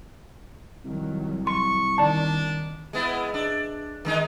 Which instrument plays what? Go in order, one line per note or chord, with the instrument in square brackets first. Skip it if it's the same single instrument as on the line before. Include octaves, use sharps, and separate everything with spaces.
[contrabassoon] C2 [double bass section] D#3 F#3
[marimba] C6 [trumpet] C#6
[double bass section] D#3 [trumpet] D4 [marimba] D5 A5
[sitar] G#3 B3 E4
D4
D#3 G#3 D#4